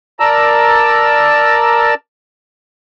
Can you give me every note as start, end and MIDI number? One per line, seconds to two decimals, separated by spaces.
0.20 1.94 70
0.20 1.94 74
0.20 1.94 81
0.20 1.94 82
0.20 1.94 88